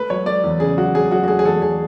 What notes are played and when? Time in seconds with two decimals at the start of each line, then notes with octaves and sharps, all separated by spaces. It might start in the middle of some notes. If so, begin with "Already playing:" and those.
Already playing: A3 B4
0.10 F#3 C#5
0.26 A3 D5
0.44 E2
0.60 C#3 G#4
0.77 F#3 F#4
0.94 F#3 G#4
1.11 F#3 F#4
1.24 F#4
1.28 A3 G#4
1.39 G#4
1.45 E2 A4
1.62 E2 G#4